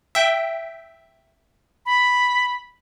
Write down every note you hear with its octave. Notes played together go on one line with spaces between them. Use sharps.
E5 G5
B5